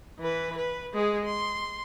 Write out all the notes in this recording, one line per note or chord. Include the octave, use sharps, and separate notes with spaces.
E3 B4
B4
G#3 G#4
C6